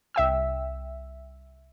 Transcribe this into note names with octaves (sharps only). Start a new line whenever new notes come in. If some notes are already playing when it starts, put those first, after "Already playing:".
C2 E5 G5 E6